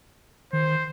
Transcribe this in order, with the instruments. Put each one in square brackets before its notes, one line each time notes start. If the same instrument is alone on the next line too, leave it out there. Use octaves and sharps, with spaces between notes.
[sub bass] D#3 [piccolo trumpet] C5